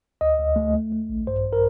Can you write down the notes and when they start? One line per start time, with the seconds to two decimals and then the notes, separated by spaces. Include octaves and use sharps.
0.21 D2 D#5
0.38 D2
0.56 A3
0.74 A3
0.92 A3
1.09 A#1
1.27 G2 C5
1.53 A#4